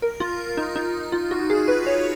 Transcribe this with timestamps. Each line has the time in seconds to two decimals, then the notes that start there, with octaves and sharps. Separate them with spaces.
0.02 A#4
0.20 F4
0.57 D#4
0.76 D#4
1.12 F4
1.31 F#4
1.50 G#4
1.68 B4
1.87 C#5